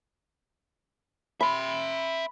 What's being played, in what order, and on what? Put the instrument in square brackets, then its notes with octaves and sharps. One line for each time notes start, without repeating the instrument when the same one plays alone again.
[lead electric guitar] E5 C6 [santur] B5